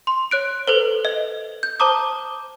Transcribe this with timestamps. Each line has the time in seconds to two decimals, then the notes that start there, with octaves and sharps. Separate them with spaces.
0.07 C6
0.31 C#5 F#6 D7
0.67 A4 B4 C5
1.05 D#5
1.63 G6
1.80 C5 A5 A#5 D6 D#6